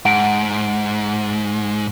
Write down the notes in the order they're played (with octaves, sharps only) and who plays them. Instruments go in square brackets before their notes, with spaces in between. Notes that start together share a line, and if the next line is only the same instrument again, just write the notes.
[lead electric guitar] G#2 [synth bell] F#5 D7